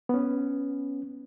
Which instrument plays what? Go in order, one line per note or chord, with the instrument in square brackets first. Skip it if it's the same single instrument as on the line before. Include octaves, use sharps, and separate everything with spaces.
[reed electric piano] B3 C#4